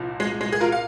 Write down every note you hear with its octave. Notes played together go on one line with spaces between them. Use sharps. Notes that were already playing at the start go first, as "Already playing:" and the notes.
Already playing: C2 A#2 F3
G#3
G#3
G#4
F4 A#4
F5